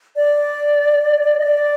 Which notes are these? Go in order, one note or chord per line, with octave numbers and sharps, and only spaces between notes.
D5
D#5
D5